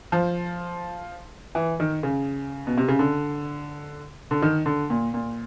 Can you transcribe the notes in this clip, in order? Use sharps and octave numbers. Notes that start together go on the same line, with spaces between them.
F3
E3
D#3
C#3
B2
C3
C#3
D3
D3
D#3
D3
A#2
A#2